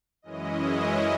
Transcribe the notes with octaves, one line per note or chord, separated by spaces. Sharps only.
F#2 E3 G#3 C#4 E4 D#5